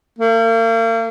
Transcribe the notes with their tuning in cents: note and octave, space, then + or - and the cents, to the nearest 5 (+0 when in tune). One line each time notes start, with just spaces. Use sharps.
A#3 -40